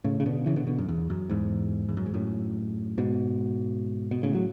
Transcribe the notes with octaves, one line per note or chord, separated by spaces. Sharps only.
A2 C#3
C#3
B2 D3
C#3 E3
B2 D3
B2 D3
F#2
E2
F#2
E2 G#2
E2
F#2
G#2
F#2 A2
G#2 B2
B2
A2 C#3
F#3